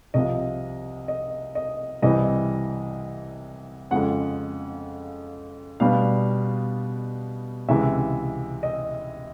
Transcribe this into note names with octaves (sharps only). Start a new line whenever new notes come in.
C2 C3 F3 D#5
D#5
D#5
C2 C3 E3 G3 C4 D#5
F2 C#3 F3 G#3 F#5
B2 G3 B3 D4 F5
C#2 C3 E3 G#3 E5
D#5